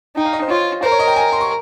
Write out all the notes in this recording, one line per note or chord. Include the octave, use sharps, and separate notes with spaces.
D#4 G5
F5
D#5
C5
F4 C#5
A#4 C5
C#5
D#5
G5
G#5
C6
C#6